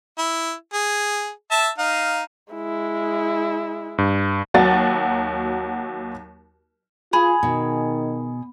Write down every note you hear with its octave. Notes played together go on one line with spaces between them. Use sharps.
E4
G#4
E5 A5
D#4 F5
G#3 E4
G2
D#2 F#3 F#4 A6
F4 G#4 B5
B2 D#3